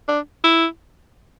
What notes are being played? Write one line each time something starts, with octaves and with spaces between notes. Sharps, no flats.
D4
E4